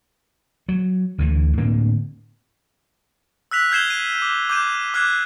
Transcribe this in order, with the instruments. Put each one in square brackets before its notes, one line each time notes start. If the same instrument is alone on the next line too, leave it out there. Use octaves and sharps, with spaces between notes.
[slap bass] F#3
D2 D3 E3
A2 D3 A#3 C4
[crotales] E6 F#6 B6 F7
F6 G6 G#6 C7 E7 G7
D#7
D6
D6 G6 D#7
D6 F6 F#6 G#6 C7